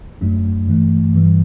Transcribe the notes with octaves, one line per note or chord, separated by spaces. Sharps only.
F#2 F#3 A3 D4
G2 E3 A3 D4
G2 E3 G3